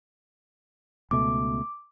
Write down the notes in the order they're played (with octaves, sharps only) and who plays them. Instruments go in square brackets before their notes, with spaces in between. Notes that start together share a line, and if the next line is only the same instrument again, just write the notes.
[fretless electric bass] C#2 B2 A3 [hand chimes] D6